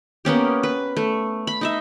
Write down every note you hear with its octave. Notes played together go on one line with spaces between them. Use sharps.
A#3 B3 C#4 G4
B4
A3
B5
D#4 D#5 E5